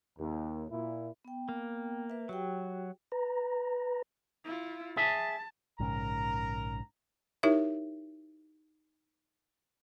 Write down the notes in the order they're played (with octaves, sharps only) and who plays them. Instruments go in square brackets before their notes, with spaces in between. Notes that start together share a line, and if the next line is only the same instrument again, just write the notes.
[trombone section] D#2
A#2 E4
[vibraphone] B3 G5
[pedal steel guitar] A#3
[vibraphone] B4 E5
[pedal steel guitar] F#3 [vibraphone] F#4 G4 G5
[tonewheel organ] B4 A#5
[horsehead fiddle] E4 F4
[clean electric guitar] G#4 E5 [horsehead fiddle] A5
[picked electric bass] A#1 G#2 C#3 [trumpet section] A#4 A#5
[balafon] D#4 E4 G4 A#4 C#5 E5